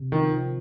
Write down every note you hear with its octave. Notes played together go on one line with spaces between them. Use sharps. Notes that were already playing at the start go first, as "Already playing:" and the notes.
Already playing: C3
D#3 F3
C3